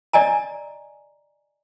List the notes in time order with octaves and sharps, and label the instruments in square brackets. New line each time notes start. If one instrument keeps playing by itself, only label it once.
[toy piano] D5 D#5 G#5 A#5